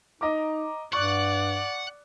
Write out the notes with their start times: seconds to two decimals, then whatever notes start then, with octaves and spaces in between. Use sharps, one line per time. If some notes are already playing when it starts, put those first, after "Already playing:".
0.21 D#4 D#5 A#5 D6
0.93 G2 D5 F#5 C#6 F#6